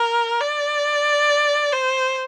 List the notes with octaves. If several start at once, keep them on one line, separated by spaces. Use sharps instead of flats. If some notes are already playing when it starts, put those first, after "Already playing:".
Already playing: A#4
D5
C5